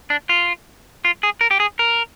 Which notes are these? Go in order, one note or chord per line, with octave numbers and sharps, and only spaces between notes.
D4
F4
F4
G#4
A#4
G4
G#4
A#4